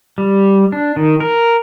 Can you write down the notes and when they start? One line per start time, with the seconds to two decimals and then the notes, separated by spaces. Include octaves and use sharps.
0.18 G3
0.72 D4
0.96 D#3
1.20 A#4